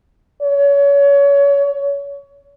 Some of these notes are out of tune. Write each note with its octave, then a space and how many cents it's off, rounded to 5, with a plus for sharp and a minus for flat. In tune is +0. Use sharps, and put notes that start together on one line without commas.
C#5 +30